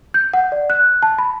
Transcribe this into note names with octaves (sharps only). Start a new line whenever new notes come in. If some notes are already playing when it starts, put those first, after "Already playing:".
G6
F#5
D5
F#6
A5
B5